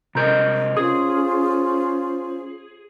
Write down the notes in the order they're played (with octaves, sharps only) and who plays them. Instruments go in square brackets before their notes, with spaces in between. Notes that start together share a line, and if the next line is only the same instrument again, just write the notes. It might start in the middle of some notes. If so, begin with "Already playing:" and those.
[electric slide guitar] C3 A#4 D#5 [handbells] A#5 G6
[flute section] C#4 F4 C5 [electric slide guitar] G#4 [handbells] D#6